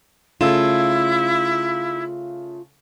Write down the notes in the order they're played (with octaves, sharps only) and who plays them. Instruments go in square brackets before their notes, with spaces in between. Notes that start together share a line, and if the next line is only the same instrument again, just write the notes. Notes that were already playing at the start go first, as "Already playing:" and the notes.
[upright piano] C#3 A3 E7 [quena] E4 [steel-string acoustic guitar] F4